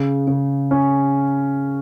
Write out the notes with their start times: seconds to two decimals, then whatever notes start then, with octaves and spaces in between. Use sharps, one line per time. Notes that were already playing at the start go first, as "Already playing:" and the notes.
Already playing: C#3
0.27 C#3
0.71 C#4